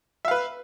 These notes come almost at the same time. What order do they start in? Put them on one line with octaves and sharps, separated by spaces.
E5 F5 B4